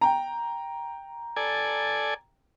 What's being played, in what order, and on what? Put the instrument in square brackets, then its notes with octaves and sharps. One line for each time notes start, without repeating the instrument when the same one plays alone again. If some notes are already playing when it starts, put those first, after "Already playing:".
[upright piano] G5 A#5
[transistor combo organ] A4 D5 G#5